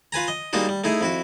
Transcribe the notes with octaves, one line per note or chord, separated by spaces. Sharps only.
F4 B4 G#5 A#5
D#5
G3 G#3 A#3 D4 D#4 F#4
G3
A3 D#4 E4 G#4
F2 E4 F#4